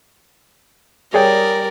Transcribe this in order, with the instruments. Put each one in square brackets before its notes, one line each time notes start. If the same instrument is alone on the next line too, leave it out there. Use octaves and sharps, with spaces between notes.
[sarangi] G3 [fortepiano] G#4 C#5 G5 [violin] A#4 [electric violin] D5